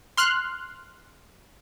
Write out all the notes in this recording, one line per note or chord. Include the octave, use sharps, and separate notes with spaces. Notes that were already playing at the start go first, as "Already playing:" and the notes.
C6 F6 F#6